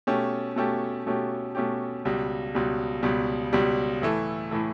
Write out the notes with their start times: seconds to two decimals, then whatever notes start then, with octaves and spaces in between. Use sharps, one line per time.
0.07 B2 A3 C#4 G4
0.56 B2 A3 C#4 G4
1.07 B2 A3 C#4 G4
1.55 B2 A3 C#4 G4
2.05 C#2 B2 G3
2.55 C#2 B2 G3
3.03 C#2 B2 G3
3.53 C#2 B2 G3
4.02 A2 E3 A3
4.51 A2 E3 A3